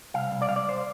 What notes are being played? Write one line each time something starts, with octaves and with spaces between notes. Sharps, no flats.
C2 F5
C2
D5
C2 F5
D5
C5